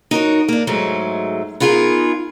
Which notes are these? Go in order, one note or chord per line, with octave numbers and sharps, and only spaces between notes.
D#4 F#4 A#4 C#5
A#3 D4
G#2 F#3 G#3 A3
B3 D#4 F4 G#4 A#4